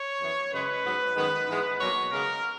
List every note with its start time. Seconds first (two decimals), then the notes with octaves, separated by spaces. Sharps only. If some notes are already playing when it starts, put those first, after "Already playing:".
Already playing: C#5
0.20 F#2 E3 B3
0.52 F#2 C#3 G#3 B4
0.84 G#2 F#3 B3
1.16 F#2 D#3 G#3 B3
1.48 G#2 E3 G#3 B3
1.80 B2 F#3 A#3 C#5
2.11 C#3 G#3 B3 A#4